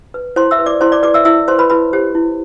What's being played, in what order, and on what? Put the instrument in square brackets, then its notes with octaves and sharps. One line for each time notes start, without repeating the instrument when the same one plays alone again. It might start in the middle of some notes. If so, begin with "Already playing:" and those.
[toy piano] B4
E4 C5 C6
E5 E6
B4
D5 D6
E4 C5 C6
D5 D6
B4 D5 D6
E5 E6
E4 E5 E6
B4 C5 C6
B4 B5
E4 B4 B5
G4 C5
E4